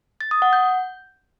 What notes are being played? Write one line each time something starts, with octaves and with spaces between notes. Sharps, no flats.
A6
D#6
F#5
G6